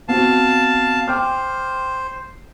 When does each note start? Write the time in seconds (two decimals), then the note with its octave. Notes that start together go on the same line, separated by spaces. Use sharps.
0.09 B3 C4 F#4 F5 A5
1.08 C5 G5 D6 F6